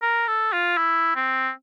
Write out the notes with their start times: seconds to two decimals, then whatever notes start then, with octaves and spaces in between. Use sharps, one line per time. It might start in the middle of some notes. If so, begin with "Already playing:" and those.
0.02 A#4
0.27 A4
0.53 F4
0.77 E4
1.16 C4